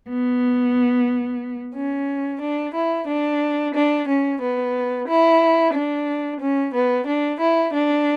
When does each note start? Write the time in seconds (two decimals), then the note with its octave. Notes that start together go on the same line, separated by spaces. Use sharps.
0.09 B3
1.74 C#4
2.40 D4
2.74 E4
3.07 D4
3.74 D4
4.07 C#4
4.40 B3
5.07 E4
5.73 D4
6.40 C#4
6.73 B3
7.06 D4
7.40 E4
7.72 D4